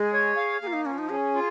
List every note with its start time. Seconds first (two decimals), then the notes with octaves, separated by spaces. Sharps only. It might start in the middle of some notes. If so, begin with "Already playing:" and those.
Already playing: G#3 G#4
0.13 C#5
0.37 F5
0.62 A#3 G#4
0.67 F4
0.73 D#4
0.86 F3 C#4
0.98 D#4
1.10 C#4 G#4
1.35 F4